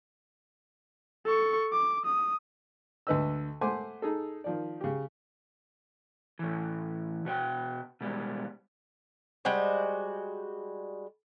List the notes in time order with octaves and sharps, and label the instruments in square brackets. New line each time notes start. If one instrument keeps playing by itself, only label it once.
[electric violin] A4 C#6
D6
D#6
[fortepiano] D2 D3 B4 D#5 E6
A3 C5 F#5 G#5 C6 D6
D#4 G#4 A4
D#3 F3 D5
C#3 G4
[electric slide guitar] A2 E3
B2 F#4 C#5 G5
B2 G3 G#3
[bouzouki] G3 G#3 F#4 C5